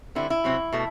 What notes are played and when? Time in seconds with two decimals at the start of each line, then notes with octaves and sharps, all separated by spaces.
0.15 D3 G3 C4 E4
0.30 E4
0.44 C3 F#3 C4
0.73 B2 A3